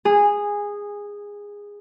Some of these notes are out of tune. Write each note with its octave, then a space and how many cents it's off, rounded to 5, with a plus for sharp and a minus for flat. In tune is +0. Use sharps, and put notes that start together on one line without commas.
G#4 -15